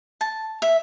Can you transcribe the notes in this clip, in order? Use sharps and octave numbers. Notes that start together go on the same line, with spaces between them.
A5
E5